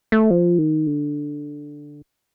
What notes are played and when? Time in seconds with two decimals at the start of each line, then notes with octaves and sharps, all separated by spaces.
0.12 A3
0.31 F3
0.58 D#3
0.86 D3